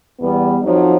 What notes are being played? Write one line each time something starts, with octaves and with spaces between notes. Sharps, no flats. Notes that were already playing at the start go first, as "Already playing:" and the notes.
E2 G3 B3
F2 F3 F#3 D#4